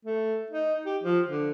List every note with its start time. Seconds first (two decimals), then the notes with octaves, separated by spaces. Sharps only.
0.05 A3
0.50 D#4
0.86 G4
1.03 F3
1.27 D3